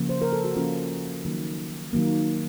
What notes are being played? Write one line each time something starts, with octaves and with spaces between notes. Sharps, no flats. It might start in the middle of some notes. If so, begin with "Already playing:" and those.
Already playing: C#3 F3 A#3
C5
A#4
A4
F#4
C#3 F3 A#3 C#4 F4
D#3 F#3 A#3
D#3 F#3 A#3